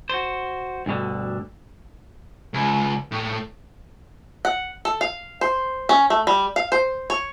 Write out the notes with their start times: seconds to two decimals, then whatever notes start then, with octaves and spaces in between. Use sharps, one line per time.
0.10 F#4 C5
0.86 D2 G2 B2 D3
2.54 C#2
3.12 A2
4.45 F#5
4.85 A4
5.01 F5
5.41 C5
5.89 C#4
6.10 A3
6.27 G3
6.56 F5
6.72 C5
7.10 C#5